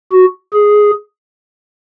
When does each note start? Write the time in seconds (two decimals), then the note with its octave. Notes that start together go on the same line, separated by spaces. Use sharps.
0.12 F#4
0.54 G#4